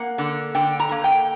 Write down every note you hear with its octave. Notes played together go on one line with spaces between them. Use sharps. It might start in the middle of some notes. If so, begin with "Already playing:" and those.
Already playing: A#3 F#5
D3
D3 G5
A#5
A#3
G5